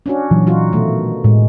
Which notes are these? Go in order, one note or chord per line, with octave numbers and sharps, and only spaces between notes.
C#4 D4 F#4
A#2 E3 F#3
D#4 F4 F#4
B2 D#3 A3
A2 G#3